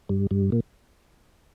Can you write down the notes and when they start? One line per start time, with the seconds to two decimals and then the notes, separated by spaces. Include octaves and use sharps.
0.09 G2
0.31 G2
0.52 A#2